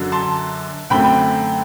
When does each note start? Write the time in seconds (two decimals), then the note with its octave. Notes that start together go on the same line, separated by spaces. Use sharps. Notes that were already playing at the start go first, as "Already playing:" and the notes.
Already playing: F#2 D3 F#3
0.12 A5 C6
0.90 F#2 D3 A3 C4 G5 B5